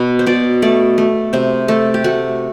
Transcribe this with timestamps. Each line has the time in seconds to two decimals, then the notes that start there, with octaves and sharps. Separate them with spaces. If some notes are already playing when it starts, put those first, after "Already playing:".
Already playing: B2 B4
0.19 C5
0.26 B2 D5
0.62 A3 D5
0.98 A3
1.33 C3 C5
1.68 A3 A4
1.94 G4
2.04 A3 F#4